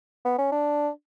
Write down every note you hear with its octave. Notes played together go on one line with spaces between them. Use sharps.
B3
C#4
D4